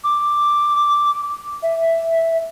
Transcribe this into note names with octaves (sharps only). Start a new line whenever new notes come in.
D6
E5